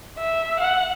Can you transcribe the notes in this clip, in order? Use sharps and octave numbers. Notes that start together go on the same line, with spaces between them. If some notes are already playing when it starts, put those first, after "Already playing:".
E5
F#5